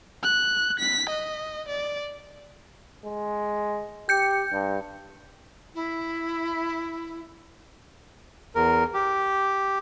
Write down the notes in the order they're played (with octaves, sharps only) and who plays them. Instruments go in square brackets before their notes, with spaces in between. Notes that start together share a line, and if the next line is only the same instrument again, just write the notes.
[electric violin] F#6
B6
D#5
D5
[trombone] G#3
[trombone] G4 [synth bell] G6 C#7
[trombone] G2
[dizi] E4
[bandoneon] E2 A#4
G4